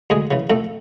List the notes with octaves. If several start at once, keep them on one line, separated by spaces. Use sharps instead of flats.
D2 G#3 G#4
C#3 E3
F2 A3 A4